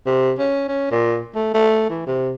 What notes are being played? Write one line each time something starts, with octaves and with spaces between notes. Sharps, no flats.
C3
C#4
C#4
A#2
A3
A3
E3
C3